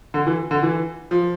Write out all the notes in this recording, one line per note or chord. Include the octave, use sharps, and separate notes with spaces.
D3
E3
D3
E3
F3